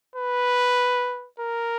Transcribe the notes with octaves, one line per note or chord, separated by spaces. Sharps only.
B4
A#4